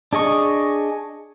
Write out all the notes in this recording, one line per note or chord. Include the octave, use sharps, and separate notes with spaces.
D4 G#4 D#5 C#6